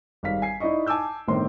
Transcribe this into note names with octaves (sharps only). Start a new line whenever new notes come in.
G#1 G3 F5 B6
G#5 C7
D#4 E4 D5 D#5 C#6
G#5 A5 D6 E6 G6
G1 A2 D#3 C4 C6